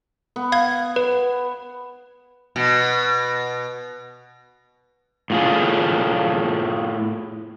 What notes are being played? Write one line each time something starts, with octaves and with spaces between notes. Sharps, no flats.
B3
F5 G#6
B4
B2
A2 F4 G#4